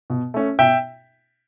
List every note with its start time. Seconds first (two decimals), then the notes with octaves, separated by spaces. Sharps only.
0.10 B2
0.34 A3 C#4
0.59 B2 E5 G5